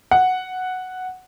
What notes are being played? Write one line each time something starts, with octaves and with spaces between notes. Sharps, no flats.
F#5